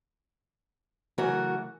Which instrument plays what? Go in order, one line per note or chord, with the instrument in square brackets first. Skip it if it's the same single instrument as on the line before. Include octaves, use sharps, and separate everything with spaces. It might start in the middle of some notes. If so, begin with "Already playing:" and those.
[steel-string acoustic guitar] C#3 E3 F#3 A3 F#4 A#4